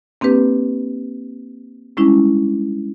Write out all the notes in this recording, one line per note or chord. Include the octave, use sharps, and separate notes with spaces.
A#3 C4 D4 G4 B4
G3 G#3 C#4 D4 E4